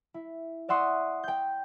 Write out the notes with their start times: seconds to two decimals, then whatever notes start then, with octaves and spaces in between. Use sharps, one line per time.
0.14 E4
0.68 D5 E5 F#5 C6 C#6 D#6
1.24 G5 G6